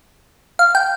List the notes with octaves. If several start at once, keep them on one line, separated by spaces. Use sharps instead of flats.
F5
G5